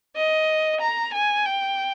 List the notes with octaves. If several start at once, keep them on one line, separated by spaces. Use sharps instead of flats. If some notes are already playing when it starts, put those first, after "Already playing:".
D#5
A#5
G#5
G5